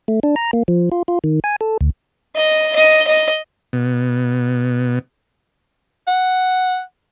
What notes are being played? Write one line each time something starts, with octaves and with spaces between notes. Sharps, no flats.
A3
D4
A#5
A#3
F3
F4
F4
D#3
G#5
A4
D2
D#5
D#5
D#5
B2
F#5